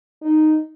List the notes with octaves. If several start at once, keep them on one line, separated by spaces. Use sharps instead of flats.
D#4